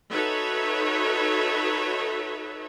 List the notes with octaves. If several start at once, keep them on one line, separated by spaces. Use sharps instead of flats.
D#4 F#4 A4 B4 C#5 E5